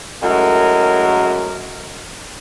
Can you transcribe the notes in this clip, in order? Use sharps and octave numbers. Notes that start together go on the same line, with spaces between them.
F#2 A2 G#3 F#4 A#4